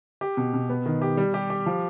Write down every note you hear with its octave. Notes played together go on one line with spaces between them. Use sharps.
G4
B2
B2
B3
D#3
G4
G3
G4
G4
F3